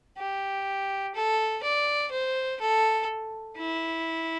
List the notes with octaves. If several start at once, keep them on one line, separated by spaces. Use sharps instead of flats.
G4
A4
D5
C5
A4
E4